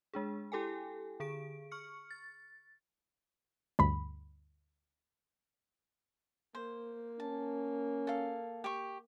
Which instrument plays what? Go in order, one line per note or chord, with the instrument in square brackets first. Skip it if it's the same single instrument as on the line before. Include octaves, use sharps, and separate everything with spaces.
[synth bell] G#3 D4 G#4
E4 G4 A4 G5 G#5
D3 G#4 D7
C#6 F6 C#7
A6
[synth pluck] D2 G2 B5
[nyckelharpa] A#3 [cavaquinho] C5
[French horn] C#4 [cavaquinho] A5
[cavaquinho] A4 F5
G4 C#6